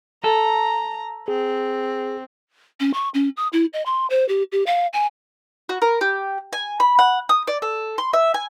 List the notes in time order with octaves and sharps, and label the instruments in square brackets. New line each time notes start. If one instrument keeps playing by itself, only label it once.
[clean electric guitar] A4 [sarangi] A#5
[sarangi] C4 [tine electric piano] G#4
[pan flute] C#4
C#6
C#4
D#6
E4
D#5
C6
C5
G4
G4
F5
G#5
[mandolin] F#4
A#4
G4
G#5
B5
F#5
D#6
D5
A4
C6
E5
G#5